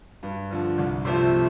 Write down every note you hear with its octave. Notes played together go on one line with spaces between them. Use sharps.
G2
D3 F3
C2
C3 F3 A3 C4